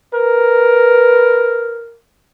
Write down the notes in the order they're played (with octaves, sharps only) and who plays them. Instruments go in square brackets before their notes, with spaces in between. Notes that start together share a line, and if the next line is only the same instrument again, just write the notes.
[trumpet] A#4 [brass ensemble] B4